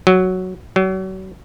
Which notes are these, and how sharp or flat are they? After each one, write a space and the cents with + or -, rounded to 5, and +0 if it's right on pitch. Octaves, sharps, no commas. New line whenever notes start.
F#3 +0
F#3 +35